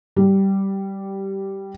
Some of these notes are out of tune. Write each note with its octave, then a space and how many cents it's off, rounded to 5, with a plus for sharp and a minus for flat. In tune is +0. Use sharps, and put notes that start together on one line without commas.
G3 -10